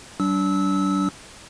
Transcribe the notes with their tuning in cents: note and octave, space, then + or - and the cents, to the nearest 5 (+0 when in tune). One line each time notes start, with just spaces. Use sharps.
G3 -45 D4 -25 E6 -20